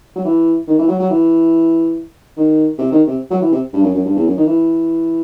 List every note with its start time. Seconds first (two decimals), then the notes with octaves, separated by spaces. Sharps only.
0.16 F#3
0.25 E3
0.67 D#3
0.78 E3
0.88 F#3
0.99 F#3
1.10 E3
2.37 D#3
2.78 C3
2.92 D#3
3.07 C3
3.30 F#3
3.41 E3
3.52 C3
3.73 G2
3.83 F#2
3.95 F#2
4.05 G2
4.16 E2
4.27 F#2
4.37 D#3
4.47 E3